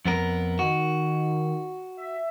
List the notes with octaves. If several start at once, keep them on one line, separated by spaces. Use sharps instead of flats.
F2 B3 A#4
D#3 F#4
E5